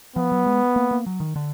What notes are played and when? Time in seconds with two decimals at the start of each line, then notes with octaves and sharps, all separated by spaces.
0.16 F3 B3
0.32 F#3
0.46 G#3
0.76 A#3
0.91 A#3
1.06 F#3
1.20 D#3
1.36 D3